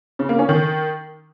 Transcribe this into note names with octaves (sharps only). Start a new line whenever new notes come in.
C#3
A#3
C#4
D#3